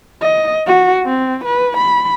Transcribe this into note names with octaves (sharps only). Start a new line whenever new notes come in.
D#5
F#4
C4
B4
B5